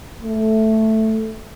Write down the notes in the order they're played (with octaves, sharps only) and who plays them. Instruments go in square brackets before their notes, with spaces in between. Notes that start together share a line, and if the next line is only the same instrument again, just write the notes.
[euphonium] A3